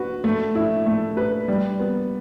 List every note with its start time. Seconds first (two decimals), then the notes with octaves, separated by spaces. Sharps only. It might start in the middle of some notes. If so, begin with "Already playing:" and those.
Already playing: F#4 B4
0.24 A3
0.55 E4
0.86 A3
1.17 B4
1.48 G3
1.80 B3